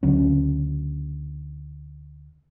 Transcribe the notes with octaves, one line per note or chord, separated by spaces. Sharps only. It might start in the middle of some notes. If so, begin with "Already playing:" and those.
D2 C#3 F#3 C#4